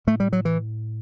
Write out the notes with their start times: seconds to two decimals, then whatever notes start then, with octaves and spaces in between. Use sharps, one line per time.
0.07 A2 A3
0.20 G3
0.33 F#3
0.45 E3